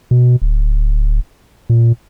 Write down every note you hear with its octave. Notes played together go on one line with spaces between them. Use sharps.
B2
D1
A#2